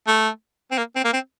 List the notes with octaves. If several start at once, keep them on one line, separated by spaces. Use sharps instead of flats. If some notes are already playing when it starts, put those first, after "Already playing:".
A3
C4
A#3
C4
A#3
C4